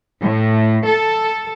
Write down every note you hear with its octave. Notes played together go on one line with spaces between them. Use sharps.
A2
A4